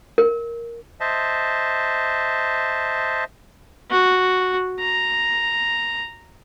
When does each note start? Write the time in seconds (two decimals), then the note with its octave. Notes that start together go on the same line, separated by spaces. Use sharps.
0.18 A#4
1.01 C5 D#5 E5 A5
3.90 F#4
4.80 A#5